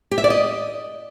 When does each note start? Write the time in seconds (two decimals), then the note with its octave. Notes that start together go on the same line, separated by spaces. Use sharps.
0.11 G4
0.18 E5
0.24 D5
0.30 D#5